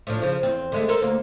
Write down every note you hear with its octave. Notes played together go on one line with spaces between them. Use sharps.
A2 F3 D4
C#3 F3
E2 C4
D3 G#3 A3
A4 A#4 C5
D2 A#3